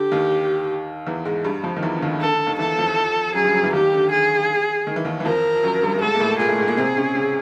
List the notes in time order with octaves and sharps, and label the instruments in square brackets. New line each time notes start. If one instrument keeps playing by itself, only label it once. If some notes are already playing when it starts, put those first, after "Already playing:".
Already playing: [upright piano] D3 [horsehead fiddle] G4
[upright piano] D#2 D#3
E2 E3
G#2 G#3
G2 G3
F2 F3
D#3
E2 E3
D3
D#2 D#3
[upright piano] D3 [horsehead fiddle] A4
[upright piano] D3
D#2 D#3
[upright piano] E2 E3 [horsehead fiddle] A4
[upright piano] F2 F3
[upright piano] F#2 F#3 [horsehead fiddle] G#4
[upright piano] G2 G3
F#2 F#3
E2 E3
[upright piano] D#2 D#3 [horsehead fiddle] G4
[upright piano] D3
[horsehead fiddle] G#4
[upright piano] D#3
E3
D#2 D#3
E3
[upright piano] F2 F3 [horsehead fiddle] A#4
[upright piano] F#2 F#3
G2 G3
A3
[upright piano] G#2 G#3 [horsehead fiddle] A4
[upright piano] A#3
A2 A3
[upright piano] A#2 A#3 [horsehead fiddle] G#4
[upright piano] A2 A3
G#2 G#3
A#2 A#3
C3 C4
C#3 C#4
C#3 C#4